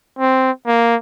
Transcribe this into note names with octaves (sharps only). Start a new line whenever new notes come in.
C4
A#3